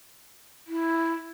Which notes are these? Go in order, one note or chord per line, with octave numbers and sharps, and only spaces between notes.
E4